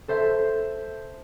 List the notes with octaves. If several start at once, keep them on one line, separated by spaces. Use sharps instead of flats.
A4 C5 E5 C6